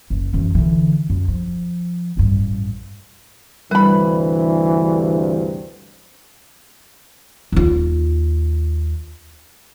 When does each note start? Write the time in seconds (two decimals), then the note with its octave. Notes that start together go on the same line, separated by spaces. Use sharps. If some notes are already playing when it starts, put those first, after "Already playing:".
0.10 F#1
0.33 F#2 E3
0.55 D3 E3
1.10 F#2
1.28 F3
2.17 A1 G2
3.71 D2 G2 C3 E3 G3 B4 B5
7.52 D#2 F4